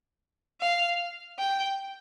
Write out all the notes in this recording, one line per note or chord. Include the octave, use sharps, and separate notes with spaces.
F5
G5